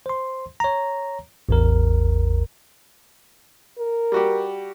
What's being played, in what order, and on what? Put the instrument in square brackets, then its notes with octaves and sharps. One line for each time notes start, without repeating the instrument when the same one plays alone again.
[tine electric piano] C5 C6
C#5 A#5
A1 E2 A#4
[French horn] A#4
[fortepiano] G3 F#4 G4